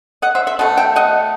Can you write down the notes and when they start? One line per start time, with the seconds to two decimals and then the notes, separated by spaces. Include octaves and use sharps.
0.22 D#5 F#5
0.35 C5 E5
0.47 C5 E5
0.59 B2 A3 D#5 F#5
0.77 E5 G5
0.96 D#5 F#5